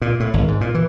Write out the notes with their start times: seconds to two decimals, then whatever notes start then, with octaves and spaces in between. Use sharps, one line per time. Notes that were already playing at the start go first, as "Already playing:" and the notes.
0.02 A#2
0.20 A2
0.34 G#1
0.48 G#2
0.61 A#2
0.74 E3